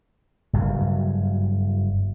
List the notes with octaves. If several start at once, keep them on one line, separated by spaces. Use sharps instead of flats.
F#1 G2 F#3